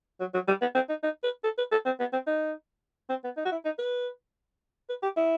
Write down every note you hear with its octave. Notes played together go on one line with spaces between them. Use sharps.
F#3
F#3
G3
B3
C4
D#4
D#4
B4
A4
B4
A4
C4
B3
C4
D#4
C4
B3
D#4
F#4
E4
D#4
B4
B4
G4
E4